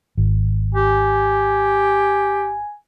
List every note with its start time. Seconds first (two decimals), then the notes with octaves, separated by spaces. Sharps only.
0.17 G#1
0.75 G4 G#5